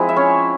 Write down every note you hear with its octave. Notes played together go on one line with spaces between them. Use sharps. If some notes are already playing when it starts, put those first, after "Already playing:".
Already playing: F3 G#3 C4 E4
E5
C#4 C#5